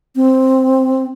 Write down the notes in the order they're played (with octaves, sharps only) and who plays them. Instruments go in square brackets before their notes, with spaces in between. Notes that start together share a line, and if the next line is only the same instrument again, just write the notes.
[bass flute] C4